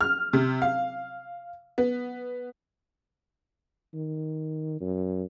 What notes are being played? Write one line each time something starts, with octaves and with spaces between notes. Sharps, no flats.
F6
C3
F5
B3
D#3
F#2